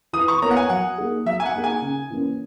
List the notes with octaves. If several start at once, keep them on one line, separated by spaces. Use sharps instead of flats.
E3 D#6
C#6
B3 E4 A#4 C#5 A#5
F#5
G#5
F#3 F#5
A#3 D#4 G#4
F#3 E5
G#5
F#5
A#3 D#4 G#4
G#5
C#3
E3 A#3 C#4